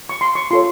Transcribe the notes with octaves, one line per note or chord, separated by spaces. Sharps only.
C#6
C6
C#6
F4 A4 C#5 C6